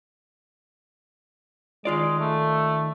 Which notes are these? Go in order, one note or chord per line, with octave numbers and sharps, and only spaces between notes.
D#3 G#3 F4 D5
A3